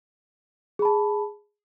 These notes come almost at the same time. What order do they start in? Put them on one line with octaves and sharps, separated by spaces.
G#4 B5 A5